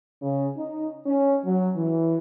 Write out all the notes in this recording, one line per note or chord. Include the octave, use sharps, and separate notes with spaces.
C#3
D#4
C#4
F#3
E3